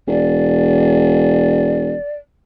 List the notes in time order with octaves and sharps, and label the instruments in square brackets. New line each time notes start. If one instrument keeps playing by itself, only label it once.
[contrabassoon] E1 [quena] D5